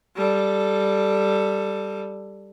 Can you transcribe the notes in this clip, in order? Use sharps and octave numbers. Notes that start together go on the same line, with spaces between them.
G3 A4